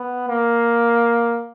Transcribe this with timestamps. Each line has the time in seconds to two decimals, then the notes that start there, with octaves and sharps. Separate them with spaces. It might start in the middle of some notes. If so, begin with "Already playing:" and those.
Already playing: B3
0.29 A#3